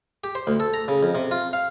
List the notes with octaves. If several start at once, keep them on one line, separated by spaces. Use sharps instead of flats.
G4
C5
D2
A4
A#5
C#3
F2
C3
F4
F5